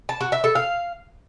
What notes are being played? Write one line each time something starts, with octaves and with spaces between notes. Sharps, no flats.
A5
F#4
E5
A4
F5